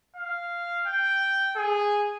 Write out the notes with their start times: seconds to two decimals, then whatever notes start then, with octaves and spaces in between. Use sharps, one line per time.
0.16 F5
0.87 G5
1.57 G#4